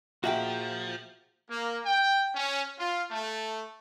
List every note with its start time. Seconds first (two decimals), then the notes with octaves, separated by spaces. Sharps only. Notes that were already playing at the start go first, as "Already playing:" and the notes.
0.24 A#2 F3 F#4 G#4 E5 G5
1.50 A#3
1.86 G5
2.35 C#4
2.79 F4
3.11 A3